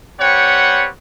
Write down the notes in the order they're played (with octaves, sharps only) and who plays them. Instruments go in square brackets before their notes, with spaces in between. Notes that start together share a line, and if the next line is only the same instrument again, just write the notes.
[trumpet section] G3 C4 B4 C#5 F#5 G5